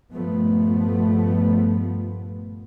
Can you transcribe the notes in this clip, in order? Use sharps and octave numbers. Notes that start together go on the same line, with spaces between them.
G2 A#2 F3 A3 B3